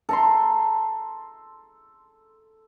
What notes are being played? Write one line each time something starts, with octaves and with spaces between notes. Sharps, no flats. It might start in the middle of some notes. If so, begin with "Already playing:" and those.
A4 A#5 C6